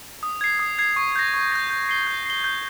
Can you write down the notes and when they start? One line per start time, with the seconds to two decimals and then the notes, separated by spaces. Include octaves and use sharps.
0.23 D#6
0.41 G#6 C7
0.59 D#6
0.79 G#6 C7
0.96 C#6
1.16 G6 A#6
1.34 C#6
1.52 G6 A#6
1.70 G6
1.89 C7 G7
2.07 G6
2.26 C7 G7
2.44 G6